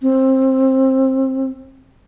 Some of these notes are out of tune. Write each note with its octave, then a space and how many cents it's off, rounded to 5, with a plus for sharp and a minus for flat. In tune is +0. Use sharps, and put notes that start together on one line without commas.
C4 +20